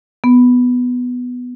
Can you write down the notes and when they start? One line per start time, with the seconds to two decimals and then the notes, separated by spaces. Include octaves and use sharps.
0.24 B3